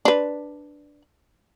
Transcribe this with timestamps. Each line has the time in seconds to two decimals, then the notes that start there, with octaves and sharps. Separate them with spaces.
0.05 D4 B4